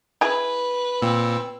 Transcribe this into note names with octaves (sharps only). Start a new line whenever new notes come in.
E4 G#4 B4 G#5
A#2 C4 E6